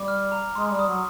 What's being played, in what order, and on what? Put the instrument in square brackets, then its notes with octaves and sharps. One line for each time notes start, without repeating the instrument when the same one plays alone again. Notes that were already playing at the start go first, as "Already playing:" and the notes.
Already playing: [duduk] G3 [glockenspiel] D6
[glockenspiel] F6
A#5
[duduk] G#3 [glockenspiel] C6
[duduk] G3
[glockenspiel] D#6
[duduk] F#3